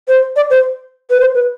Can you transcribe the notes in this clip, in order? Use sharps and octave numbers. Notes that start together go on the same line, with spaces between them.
C5
D5
C5
B4
C5
B4